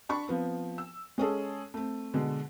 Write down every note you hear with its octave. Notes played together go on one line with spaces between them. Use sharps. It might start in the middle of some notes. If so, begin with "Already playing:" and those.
D4 B5 C#6
F3 B3 C4
E6
G#3 C#4 G#4 A4
A3 C4
B2 D3 G#3